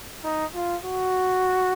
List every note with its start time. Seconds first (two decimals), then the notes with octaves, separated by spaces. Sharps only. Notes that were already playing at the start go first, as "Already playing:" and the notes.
0.24 D#4
0.54 F4
0.85 F#4